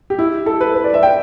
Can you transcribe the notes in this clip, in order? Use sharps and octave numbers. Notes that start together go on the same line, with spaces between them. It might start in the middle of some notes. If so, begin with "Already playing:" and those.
G4
E4
A4
B4
B4
D5
E5
G5